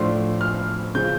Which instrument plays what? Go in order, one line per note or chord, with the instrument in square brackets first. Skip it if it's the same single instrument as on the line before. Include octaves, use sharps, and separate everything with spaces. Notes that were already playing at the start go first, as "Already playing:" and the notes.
Already playing: [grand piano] A2 F3 A3 D4 C6
F6
C#3 F3 G6